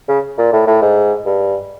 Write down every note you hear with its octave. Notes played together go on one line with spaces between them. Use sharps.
C#3
A#2
A2
A2
G#2
G2